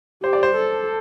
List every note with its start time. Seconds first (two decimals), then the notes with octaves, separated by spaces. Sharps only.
0.23 G4 C5
0.33 D5
0.43 C5
0.55 A4